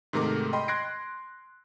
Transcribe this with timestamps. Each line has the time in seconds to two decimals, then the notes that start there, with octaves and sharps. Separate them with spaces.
0.13 G#2 C3 D#3 A3 A#4 D6
0.53 D#5 G5 B5 C6
0.68 C6 F#6 G#6 A#6 C7 D7